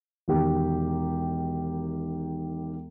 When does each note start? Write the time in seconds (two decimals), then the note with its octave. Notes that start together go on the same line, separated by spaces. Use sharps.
0.28 E1 D#3 G4